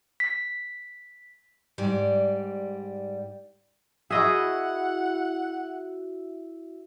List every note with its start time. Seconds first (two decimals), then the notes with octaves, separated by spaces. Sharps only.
0.20 B6
1.78 G#2 G3 D5
4.10 E4 F#4 G#4 D#5 E5 F#5